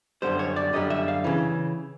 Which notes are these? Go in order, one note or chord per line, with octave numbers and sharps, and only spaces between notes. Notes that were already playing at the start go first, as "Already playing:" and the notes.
F#2 D3 G3 C5
C#5
D5
F#2 D3 G3 D#5
E5
F5
C#3 E3